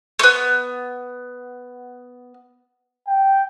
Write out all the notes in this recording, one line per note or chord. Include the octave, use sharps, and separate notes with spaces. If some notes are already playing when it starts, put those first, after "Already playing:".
A3 B3
G5